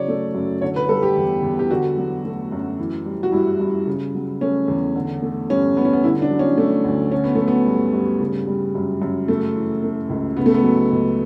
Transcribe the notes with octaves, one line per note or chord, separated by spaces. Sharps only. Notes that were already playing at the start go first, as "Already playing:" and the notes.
Already playing: C#3 F#3 C#5 D5
A3
F#2
D3 C#5
B4
G3 A4
G4
E2
E2
G4
D3 F#4
F#3
A3
F#2
E3
G3
F#4
G2 E4
G2
C#3
F#3
A3 C#4
E2
D3
A3
G2 C#4
G2 B3
C#4
B3
D3 E4
D4
F#3
C#4
A3
D2
D3 C#4
B3
F#3 A3
B3
G2
G2
C#3
G3
F#2
F#2
C#3 A3
E3
A3
C#2
C#3 B3
A3
B3
F#3
C#2